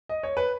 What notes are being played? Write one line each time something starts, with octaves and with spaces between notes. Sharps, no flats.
D#5
C#5
B4